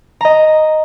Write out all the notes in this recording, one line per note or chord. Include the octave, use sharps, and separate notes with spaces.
D#5 A#5